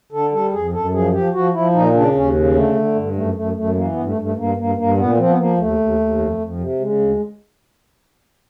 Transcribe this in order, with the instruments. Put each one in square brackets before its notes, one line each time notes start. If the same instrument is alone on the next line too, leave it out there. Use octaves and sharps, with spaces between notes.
[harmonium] D3 A4
G3 A4
F2 G#4
F#2 A4
F3 G#4
F3 G4
F3 F#4
F3 E4
A#2 D#4
C#3 D4
D#2 C#4
C#3
D3 A3
D3
G2
F#2 A3
F#2 A3
F#2 A3
E3 A#3
G2 B3
A3
G2
A3
G2 A#3
G2 A#3
G2 A#3
A#2 B3
F3 C4
B3
F3 A#3
D#2 A3
D#2
D#2
F2
F2
C3
C#3 G#3
D2